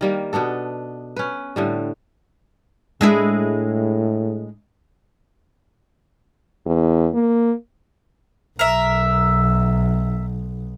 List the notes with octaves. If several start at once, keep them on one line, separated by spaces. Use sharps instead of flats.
D#3 G3 A#3
B2 B3 D4 A4
C#4 B4
A2 D3 G3
A2 G#3 D4 E4
E2
A#3
B1 A#4 E5